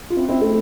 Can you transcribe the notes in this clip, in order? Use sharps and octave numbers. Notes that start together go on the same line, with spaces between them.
F4
C4 E4
C4 E4
A3 C4